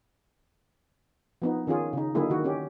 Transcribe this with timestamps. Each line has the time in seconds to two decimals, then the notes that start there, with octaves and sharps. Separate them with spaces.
1.42 F3 B3 D#4
1.67 D#3 C#4 F4 G#4
1.93 C#3 D#4
2.15 D3 F#3 G#3 A#3 E4 G#4
2.30 D#3 F#4
2.44 C#4 G4